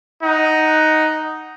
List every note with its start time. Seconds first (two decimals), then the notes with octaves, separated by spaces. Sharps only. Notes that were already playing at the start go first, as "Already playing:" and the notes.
0.23 D#4 F#5